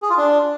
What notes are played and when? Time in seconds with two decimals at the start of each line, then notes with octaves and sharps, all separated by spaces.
0.02 G#4
0.10 F4
0.17 D4